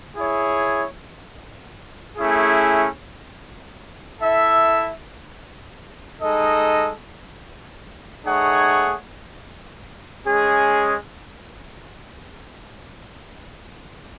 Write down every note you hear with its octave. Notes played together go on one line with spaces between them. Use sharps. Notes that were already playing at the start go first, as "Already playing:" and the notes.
E4 G#4 C#5
A3 C#4 E4 G#4
E4 A4 E5
G#3 D#4 A4 D#5
A3 D#4 G#4 C#5 F#5
G#3 C#4 G#4